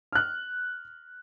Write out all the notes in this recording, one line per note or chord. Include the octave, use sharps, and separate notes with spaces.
F6 F#6